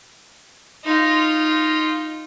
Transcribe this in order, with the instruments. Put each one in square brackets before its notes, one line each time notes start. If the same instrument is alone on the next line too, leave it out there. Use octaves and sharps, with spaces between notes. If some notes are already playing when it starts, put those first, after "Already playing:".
[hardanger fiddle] D#4 F4